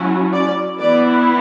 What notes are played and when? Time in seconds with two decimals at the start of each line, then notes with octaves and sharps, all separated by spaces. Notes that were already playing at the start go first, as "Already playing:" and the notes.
Already playing: F#3 C#4 E4
0.33 D5
0.78 E3 B3 E4 D5